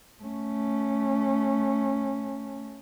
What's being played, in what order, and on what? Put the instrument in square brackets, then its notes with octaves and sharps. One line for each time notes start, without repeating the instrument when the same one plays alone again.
[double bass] A3 C#4